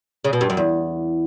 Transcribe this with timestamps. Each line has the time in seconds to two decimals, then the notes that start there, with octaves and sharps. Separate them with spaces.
0.25 C#3
0.33 B2
0.41 G2
0.50 F#2
0.57 E2